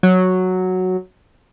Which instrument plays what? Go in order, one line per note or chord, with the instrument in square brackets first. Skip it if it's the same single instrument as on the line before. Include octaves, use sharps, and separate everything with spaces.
[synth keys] F#3